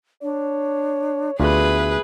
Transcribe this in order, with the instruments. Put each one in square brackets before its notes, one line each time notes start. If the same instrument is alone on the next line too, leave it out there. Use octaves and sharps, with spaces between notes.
[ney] D4 [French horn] C#5
[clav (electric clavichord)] D2 F4 D5 [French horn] B3 [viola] G#4 B4 [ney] E5